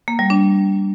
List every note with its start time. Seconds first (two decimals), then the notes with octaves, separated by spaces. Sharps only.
0.08 A#3
0.19 G3
0.30 D4